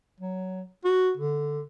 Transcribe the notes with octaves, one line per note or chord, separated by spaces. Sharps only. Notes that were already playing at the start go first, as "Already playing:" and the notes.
F#3
F#4
D3